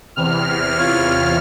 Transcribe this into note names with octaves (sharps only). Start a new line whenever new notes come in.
E2 C3 F6
F4 C#5